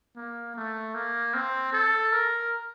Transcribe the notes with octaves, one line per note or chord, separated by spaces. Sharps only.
A#3
A3
A#3
C4
A4
A#4